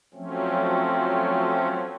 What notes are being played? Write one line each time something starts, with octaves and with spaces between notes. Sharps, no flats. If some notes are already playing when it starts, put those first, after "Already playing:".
F3 F#3 A3 C4 C#4